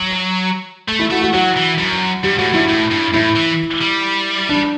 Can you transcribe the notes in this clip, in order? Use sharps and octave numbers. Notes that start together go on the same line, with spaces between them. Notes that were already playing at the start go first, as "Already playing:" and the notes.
Already playing: F#3
A3
E4
A3 F#4
F#4
F#3 F#4
E3
F#2
G2 G4
A2 F#4
G2 E4
A2
G2
A2 E4
E3
G3
D4